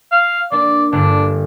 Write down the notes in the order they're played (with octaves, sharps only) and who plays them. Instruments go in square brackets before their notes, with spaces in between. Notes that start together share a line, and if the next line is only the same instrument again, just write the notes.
[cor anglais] F5
[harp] A#3 D4 [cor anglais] D5
[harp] G1 [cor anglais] D4